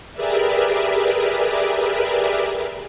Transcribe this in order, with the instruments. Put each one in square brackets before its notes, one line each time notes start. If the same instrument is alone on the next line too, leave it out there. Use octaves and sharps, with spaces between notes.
[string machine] G4 G#4 A#4 B4 D5 E5